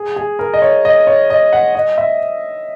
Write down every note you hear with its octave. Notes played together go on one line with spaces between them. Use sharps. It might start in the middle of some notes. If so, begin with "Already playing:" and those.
Already playing: G#4
G#4
A#4
D#5
C#5
D#5
C#5
D#5
F#5
D#5
E5